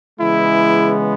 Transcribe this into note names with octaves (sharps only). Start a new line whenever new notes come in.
C#3 E3 G#3 B3 E4